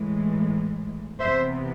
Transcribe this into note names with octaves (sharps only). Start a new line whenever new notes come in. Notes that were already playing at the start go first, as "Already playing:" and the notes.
Already playing: A2 E3 G#3
C3 E3 B3 C5 E5